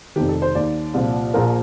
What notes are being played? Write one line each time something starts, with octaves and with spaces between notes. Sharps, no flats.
F1 F2 D#3 G4
A4
C5
D#2 D#3 D5
C2 A#2 F3
A#1 A#2 F3 A#4